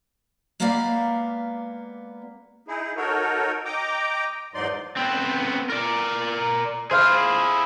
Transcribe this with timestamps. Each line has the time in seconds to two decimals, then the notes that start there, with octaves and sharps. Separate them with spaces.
0.60 G#3 A#3 B3 G4 D5 F5
2.68 D#4 E4 G#4
2.97 D#4 F#4 A4 A#4 C#5
3.65 D#5 G5 A#5 D6
4.54 E2 G#2 F#3 D#4 D5 C6
4.97 B3 C4
5.70 A#4 D5
6.91 E4 G#4 C5 F5 F6